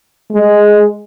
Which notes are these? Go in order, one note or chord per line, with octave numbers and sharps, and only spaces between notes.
G#3